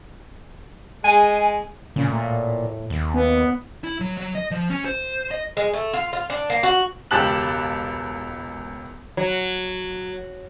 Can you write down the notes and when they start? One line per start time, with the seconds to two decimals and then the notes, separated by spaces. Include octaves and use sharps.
1.04 G#3 G#5 D#7
1.96 A#2 C#3
2.08 A2
2.90 D#2
3.14 B3
3.84 E4
4.00 F#3
4.17 F#3
4.35 D#5
4.51 F3
4.70 C#4
4.85 C5
5.31 D#5
5.57 G#3
5.73 A3
5.93 F4
6.13 F4
6.30 D4
6.50 A#3
6.63 F#4
7.11 E1 C#2 G4 A5 F#6 F#7
9.17 F#3